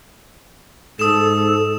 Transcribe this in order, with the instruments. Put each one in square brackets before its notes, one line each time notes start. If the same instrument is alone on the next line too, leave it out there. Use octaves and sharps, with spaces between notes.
[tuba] G#2 [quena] A4 [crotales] D#6 E7